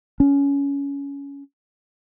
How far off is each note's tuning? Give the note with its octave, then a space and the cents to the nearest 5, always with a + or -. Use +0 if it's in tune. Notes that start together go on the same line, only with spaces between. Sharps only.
C#4 +20